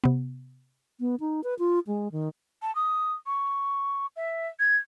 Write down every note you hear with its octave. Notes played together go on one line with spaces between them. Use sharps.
C3 B3
B3
D#4
B4
F4
G#3
D#3
A5
D#6
C#6
E5
G#6